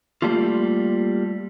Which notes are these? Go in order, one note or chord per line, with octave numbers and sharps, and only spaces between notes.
G3 A3 A#3 F4